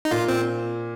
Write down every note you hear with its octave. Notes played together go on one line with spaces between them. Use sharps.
D#4
A#2 F4
C4